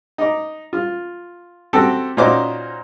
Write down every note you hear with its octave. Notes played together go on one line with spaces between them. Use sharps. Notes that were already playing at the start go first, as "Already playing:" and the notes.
D#4 D6
F4
C4 F#4 G4 A4
A#2 C#4 D#4 F#4 C5 D6